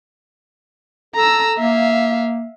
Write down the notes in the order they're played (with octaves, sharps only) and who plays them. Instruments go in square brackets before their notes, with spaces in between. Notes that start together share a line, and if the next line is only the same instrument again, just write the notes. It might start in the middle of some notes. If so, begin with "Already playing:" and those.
[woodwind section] A4 [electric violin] A#5 E6
[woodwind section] A#3 [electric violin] E5 F5